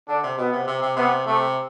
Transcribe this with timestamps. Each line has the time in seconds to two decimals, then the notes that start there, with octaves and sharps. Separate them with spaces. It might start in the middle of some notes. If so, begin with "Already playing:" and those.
0.08 D3 D4
0.23 C3
0.38 B2 B3
0.52 C3
0.67 C3
0.82 C3
0.96 C3 B3
1.27 C3 A3